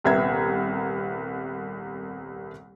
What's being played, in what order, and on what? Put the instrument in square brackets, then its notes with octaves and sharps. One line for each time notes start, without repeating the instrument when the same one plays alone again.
[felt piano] D#1 C2 B3 E5 A#5 G#6